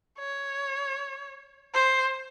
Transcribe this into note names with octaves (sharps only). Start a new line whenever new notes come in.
C#5
C5